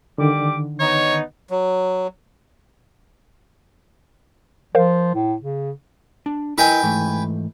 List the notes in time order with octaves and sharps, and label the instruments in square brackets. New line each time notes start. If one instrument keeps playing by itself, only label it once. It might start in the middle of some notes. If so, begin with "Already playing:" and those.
[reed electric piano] D3 D#3 [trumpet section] G3 D6
[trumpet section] B3 D#4 [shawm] C#5
[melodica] F#3
[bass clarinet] F3 [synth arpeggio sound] A#4 C5 F5
[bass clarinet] A2
C#3
[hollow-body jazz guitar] D4
[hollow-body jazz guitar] E4 A#4 D#5 [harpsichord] B4 G5 G#5
[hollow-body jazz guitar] G#2 E3 A3